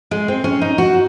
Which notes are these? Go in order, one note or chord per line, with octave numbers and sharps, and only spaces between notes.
G#3
C4
C#4
D#4
F#4